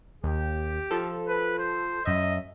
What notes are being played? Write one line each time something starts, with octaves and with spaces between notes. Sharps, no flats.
D#2 G4
F3 A4
B4
C5
F#2 D#5 E5